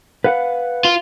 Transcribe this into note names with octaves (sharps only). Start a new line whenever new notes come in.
B4 F5 F#5
F4